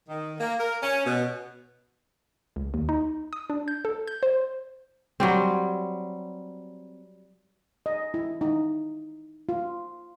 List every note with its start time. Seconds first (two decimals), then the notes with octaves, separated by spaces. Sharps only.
0.09 D#3
0.40 A#3
0.60 A#4
0.83 C#4
1.06 B2
2.56 C#2
2.74 D#2
2.89 D#4
3.33 D#6
3.50 D4
3.68 G6
3.85 A4
4.07 G6
4.23 C5
5.20 F#3 G3 C4
7.86 D#5
8.14 E4
8.41 D#4
9.49 F4